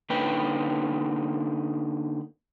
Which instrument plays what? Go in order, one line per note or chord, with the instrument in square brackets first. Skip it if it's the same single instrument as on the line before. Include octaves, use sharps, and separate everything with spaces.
[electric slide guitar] D3 A#3 C#4 D#4 B4 G5